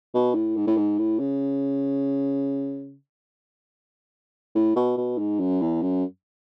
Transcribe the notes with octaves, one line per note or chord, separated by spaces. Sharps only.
B2
A2
G#2
A2
G#2
A2
C#3
A2
B2
B2
G#2
F#2
E2
F#2